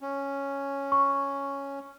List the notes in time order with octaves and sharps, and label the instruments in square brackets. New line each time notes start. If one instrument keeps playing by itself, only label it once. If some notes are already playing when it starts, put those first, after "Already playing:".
[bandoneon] C#4
[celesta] C#6